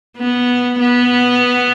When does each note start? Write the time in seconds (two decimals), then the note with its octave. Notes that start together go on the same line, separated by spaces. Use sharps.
0.17 B3
0.79 B3